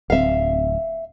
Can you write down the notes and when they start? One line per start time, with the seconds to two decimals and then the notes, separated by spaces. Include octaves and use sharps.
0.10 D1 C4 E5 F5